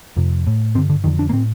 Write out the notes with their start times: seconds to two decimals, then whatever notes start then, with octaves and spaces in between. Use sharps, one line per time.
0.17 F2 C3
0.47 A2
0.75 G2 C4
0.78 D3
0.90 D3
1.04 F2 D3 D#3
1.19 D4
1.29 A#3
1.33 A2 C4